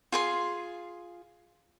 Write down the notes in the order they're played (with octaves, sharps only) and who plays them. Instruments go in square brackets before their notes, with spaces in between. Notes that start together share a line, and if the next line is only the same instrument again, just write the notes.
[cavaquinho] F4 G#4 C6